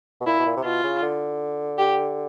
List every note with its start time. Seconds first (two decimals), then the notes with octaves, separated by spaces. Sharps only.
0.20 B2
0.26 A#2 E4
0.39 B2
0.46 A#2
0.56 C3
0.64 B2 F4
0.83 C#3
1.02 D3
1.78 G4